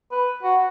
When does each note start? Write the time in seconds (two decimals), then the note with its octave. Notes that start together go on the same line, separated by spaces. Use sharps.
0.11 B4
0.43 F#4